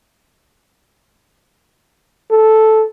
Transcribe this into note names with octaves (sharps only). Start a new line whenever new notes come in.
A4